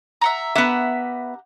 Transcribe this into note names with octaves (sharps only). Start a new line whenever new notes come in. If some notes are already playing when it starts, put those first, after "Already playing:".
E5 F#5 A#5
B3 G4 A#4 E5 F#5